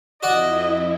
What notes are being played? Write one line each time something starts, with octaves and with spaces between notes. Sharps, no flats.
F2 E4 F#4 D5 D#5 F#5